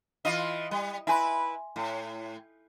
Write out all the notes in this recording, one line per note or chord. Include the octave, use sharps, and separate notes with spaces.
E3 F4 D#5
G3
E4 B4 E5 G#5 C6
A2